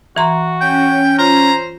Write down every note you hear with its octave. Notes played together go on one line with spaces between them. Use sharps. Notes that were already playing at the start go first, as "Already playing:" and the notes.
E3 F#4 A#5 C6
C#4 G5
F4 C5 A#5